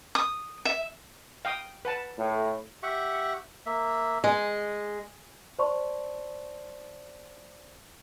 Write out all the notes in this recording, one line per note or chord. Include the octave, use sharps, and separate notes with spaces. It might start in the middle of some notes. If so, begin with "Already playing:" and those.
D#6
E5
F5 G5 D#6
B4 F#5 A5
A2
G4 E5 F#5 C#6
A#3 E5
G#3
C5 D5 A5 C6 C#6